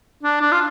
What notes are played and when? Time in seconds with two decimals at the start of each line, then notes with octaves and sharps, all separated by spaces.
0.23 D4
0.41 D4
0.52 F4